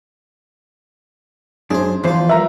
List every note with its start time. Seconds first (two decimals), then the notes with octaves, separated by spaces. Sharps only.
1.70 F#2 D4 G#4 C5
2.04 E2 E3 F3 F4 C5
2.29 G3 A#4 B4 E5 A#5